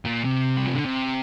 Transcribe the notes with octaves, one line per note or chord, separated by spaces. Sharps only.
A#2
C3
G3
F3
D3
C3